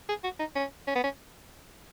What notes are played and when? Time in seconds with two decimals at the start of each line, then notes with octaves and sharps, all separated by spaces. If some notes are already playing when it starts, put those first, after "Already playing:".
0.09 G#4
0.24 F#4
0.39 D#4
0.55 C#4
0.87 C#4
0.95 B3
1.03 C#4